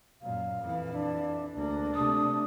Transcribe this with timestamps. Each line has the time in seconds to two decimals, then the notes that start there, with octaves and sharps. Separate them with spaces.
0.22 F#2 A#2 F5
0.61 F2 E3
0.92 D4
1.54 D2 A#3 D4
1.94 C3 A3 D#6